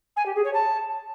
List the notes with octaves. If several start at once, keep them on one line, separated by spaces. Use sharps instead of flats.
G#5
G4
G#4
C#5
A5